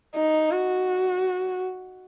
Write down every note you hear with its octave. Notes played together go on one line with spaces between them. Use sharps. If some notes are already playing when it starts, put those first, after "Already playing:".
D#4
F#4